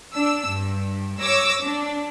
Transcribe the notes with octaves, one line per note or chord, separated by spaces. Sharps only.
D4 E6
G2
C#5 D6 E6 A#6
D4